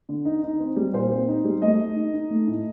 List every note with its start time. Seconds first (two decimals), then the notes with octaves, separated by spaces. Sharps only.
0.09 D3
0.25 D#4
0.43 D#4
0.60 C4
0.76 G3
0.93 A#2 C5
1.11 C4
1.28 D#4
1.45 G3
1.62 A3 D#5
1.79 A3
1.96 D#4
2.14 D#4
2.31 A3
2.47 A2